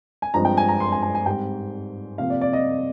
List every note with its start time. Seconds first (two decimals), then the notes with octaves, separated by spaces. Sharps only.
0.22 G#5
0.34 G2 F3 G#3 C4 A#5
0.45 G5
0.57 G#5
0.69 A#5
0.80 C6
0.92 G#5
1.03 G#5
1.15 G#5
1.26 G#2 G3 C4 G5
2.18 C3 F3 A#3 F5
2.30 D5
2.41 D5
2.53 D#5